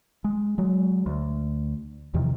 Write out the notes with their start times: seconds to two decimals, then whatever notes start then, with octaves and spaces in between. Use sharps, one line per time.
0.24 G#3
0.58 F#3 G#3
1.06 D2
2.14 E2 C3 D#3 F3